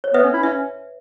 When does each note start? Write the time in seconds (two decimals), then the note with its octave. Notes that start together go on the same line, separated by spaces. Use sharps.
0.04 C#5
0.14 B3 B4 E5
0.24 C#4
0.33 E4
0.43 C#4 E5